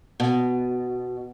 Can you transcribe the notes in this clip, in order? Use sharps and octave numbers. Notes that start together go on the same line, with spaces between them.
B2